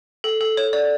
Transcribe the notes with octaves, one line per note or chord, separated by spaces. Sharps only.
A4
A4
C#5
D5